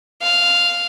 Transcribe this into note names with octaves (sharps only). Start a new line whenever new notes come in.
F5